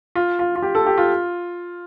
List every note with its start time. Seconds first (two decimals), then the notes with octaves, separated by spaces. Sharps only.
0.15 F4
0.39 F4
0.56 F4
0.62 G4
0.75 A4
0.86 G4
0.98 F4